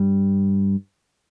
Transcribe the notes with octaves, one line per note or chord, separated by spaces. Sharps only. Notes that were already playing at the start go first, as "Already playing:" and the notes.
Already playing: G2 G3